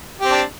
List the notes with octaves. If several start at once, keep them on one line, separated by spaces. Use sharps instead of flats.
C4 D4 G4